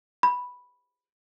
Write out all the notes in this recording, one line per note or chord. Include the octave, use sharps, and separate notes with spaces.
B5